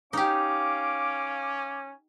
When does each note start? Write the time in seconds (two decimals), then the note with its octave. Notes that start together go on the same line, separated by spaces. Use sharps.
0.13 C#4 D#4 G4 F5 D6